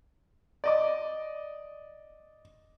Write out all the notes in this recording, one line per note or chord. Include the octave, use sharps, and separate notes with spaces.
D5 D#5 D6